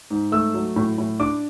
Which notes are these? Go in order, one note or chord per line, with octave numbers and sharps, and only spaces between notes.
G#2
A3 E6
F#3
A2
A2
D4 D6